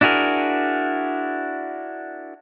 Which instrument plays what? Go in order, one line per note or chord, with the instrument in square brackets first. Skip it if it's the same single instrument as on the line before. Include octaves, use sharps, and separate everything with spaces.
[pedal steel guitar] D4 E4 F#4 G#4 A#4